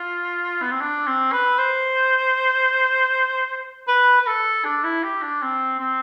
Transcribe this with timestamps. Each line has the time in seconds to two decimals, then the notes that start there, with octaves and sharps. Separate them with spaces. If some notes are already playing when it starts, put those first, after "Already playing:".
Already playing: F4
0.61 B3
0.71 C4
0.81 D4
1.07 C4
1.32 B4
1.58 C5
3.88 B4
4.22 B4
4.27 A4
4.65 D4
4.84 E4
5.03 G4
5.22 D4
5.42 C4
5.80 C4